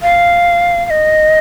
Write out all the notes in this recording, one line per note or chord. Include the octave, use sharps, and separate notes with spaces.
F5
F5
D#5